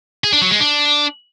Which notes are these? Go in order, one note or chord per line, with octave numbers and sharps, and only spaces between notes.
G#4
D4
F#3
G#3
D4